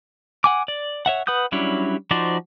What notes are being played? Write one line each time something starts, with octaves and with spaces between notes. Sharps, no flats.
F#5 G#5 D6
D5
C#5 E5 F#5
B4 F#5 D#6 G6
F#3 G3 C#4 D4 E4
F3 D#4 F#4 C5 D5